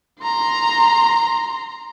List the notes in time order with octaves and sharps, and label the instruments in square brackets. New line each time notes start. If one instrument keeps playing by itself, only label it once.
[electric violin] A#5 C6